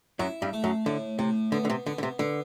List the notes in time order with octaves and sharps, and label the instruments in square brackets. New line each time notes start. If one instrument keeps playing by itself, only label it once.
[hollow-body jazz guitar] F#2 F#3 [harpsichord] E4
[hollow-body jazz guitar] G2 G3
[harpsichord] A3
[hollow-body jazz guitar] F#2 F#3
[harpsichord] A2 [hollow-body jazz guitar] D3
[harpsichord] A2 [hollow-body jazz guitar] C3
[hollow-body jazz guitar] D3 [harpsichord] B3
[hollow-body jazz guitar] D3
C3
[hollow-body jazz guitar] D3 [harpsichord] B3
[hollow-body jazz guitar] D3
C3
[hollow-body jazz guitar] D3 [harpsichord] B3